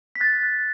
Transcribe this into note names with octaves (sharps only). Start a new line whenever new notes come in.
B6
F#6 A6
F#6